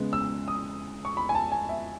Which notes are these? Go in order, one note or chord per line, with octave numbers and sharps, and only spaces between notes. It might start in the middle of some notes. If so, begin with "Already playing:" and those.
Already playing: C#3 G#3 B3
E6
D#6
C#6
B5
G#5
A5
G#5
E5